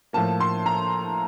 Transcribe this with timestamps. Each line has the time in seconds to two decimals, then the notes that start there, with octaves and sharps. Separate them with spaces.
0.13 A2 F3 A#3 A5
0.40 C6
0.66 A#5